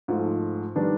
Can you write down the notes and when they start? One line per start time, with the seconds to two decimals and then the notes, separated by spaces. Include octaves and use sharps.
0.08 G#2 F3 A3
0.76 D#3 G3 B3 D4